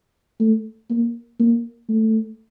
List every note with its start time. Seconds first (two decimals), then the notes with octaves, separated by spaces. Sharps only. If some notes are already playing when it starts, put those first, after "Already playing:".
0.40 A3
0.90 A#3
1.40 A#3
1.89 A3